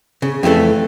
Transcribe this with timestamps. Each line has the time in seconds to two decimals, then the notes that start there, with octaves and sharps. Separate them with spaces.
0.22 C#3
0.43 F2 E3 G3 A3 A4